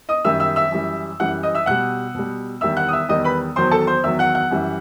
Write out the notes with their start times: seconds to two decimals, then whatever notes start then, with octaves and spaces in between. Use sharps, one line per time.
0.09 D#5 D#6
0.24 F#2 D#3 G3 E5 E6
0.40 E5 E6
0.56 E5 E6
0.72 F#2 E3 G3
1.20 F#2 E3 G3 F#5 F#6
1.43 D#5 D#6
1.55 E5 E6
1.66 B2 G3 F#5 F#6
2.15 B2 G3
2.61 E2 D#3 G3 E5 E6
2.77 F#5 F#6
2.88 D#6
2.93 E5 E6
3.08 E2 D#3 G3 D#5 D#6
3.24 B4 B5
3.56 E2 D#3 F#3 C5 C6
3.71 A4 A5
3.87 C5 C6
4.03 E2 D#3 F#3 E5 E6
4.19 F#5 F#6
4.35 F#5 F#6
4.51 F#2 E3 G3